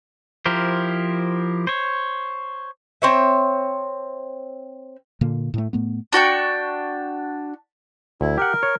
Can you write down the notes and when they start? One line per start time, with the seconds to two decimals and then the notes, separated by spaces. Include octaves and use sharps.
0.46 F3 E4 G4 A#4 C5
1.67 C5 C#5
3.02 C4 C#5 E5
5.21 A#2 D3 A#3
5.54 A2 A3
5.73 A2 A3 B3
6.13 D4 F#4 G5 C#6
8.21 D2 E4
8.38 G4 A#4 F#5
8.63 C#5